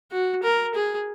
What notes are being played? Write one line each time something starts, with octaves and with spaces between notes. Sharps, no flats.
F#4
A#4
G#4